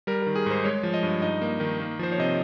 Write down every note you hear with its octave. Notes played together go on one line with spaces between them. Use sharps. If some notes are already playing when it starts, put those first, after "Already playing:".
G3 A#4
D#3 A#4
G#4
G#2 C5
G#3 C#5
F3
D#5
G2
D#4 D#5
A#3
D#3
A#3
F3 C5
C#5
C3 D#5